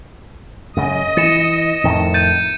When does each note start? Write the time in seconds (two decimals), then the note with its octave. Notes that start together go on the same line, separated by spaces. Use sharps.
0.77 F#2 C#3 D#5
1.17 E3 A6 C#7 E7
1.84 F2 A2 D#3
2.14 G6 A6 D#7